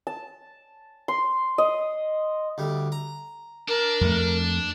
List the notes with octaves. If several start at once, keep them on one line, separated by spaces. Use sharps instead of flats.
A5
C6
D#5
D2 G3
A#5
D4 A#4 A5
F2 A3